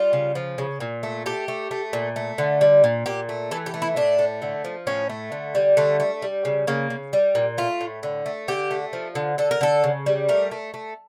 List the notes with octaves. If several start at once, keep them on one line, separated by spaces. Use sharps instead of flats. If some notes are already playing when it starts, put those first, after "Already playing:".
Already playing: G3 F4
C#3
F3
C#3
A#2
A3
A3 G4
A3
A3
A#2
A3
D3
G3
A#2
A#2 G4
A3
E3 A4
G4
A3
E4
A2 D4
A3
D3
F3
A2 C#4
A3
D3
G3
D3 A3
A3
G3
C#3
C#3 A#3
C#3
G3
A#2
A3 F4
A2
D3
A3
D3 G4
A3
F3
D3
D3 A4
A#4
D3 A4
C#3
G3
A3 A#4
A3
A3